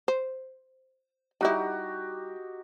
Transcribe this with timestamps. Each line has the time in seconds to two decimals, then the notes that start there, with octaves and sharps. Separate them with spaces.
0.08 C5
1.41 G3 D#4 E4 F#4 G4